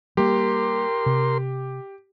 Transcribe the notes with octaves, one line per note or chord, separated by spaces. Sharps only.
G3 A#3 G4 A#4 C6
C3